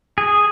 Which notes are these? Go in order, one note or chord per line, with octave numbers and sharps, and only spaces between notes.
G#4